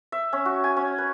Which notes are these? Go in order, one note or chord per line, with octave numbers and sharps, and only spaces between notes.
E5
C#4
F#4
G#5
C#4
B4